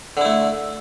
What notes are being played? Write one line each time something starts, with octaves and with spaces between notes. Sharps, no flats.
D3 A3 E4